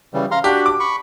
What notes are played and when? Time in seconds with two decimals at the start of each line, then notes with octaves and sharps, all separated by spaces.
0.14 C#3 E3 G3
0.31 F5 A#5 C6
0.44 D4 F#4 G4
0.66 D6
0.80 B5 C#6